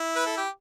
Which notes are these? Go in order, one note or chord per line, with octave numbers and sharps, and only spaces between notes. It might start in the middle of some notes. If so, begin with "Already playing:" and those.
Already playing: E4
B4
A4
G4